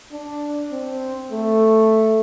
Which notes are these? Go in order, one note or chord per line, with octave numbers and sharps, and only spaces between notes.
D4
C4
A3